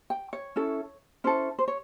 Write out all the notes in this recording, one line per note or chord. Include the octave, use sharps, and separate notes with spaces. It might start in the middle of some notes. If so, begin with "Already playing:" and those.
G5
C#5
C#4 E4 A4
C#4 E4 A4 C5
C5
C#5